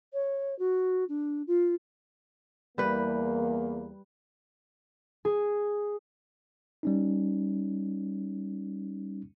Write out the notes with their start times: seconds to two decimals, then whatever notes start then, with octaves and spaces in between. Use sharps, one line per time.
0.13 C#5
0.59 F#4
1.09 D4
1.47 F4
2.78 E2 G3 A#3 B4
5.25 G#4
6.83 G3 C#4 D#4